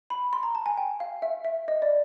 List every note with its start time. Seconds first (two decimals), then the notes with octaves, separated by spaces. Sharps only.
0.10 B5
0.33 C6
0.43 A#5
0.55 A5
0.66 G#5
0.77 G5
1.00 F5
1.22 E5
1.45 E5
1.68 D#5
1.82 D5